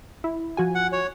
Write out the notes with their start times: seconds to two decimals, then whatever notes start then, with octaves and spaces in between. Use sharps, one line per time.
0.24 E4
0.57 F3 F#4 G#5
0.75 F#5
0.92 C#5